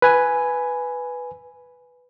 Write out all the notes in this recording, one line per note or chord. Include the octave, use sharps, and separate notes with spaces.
B4 G#5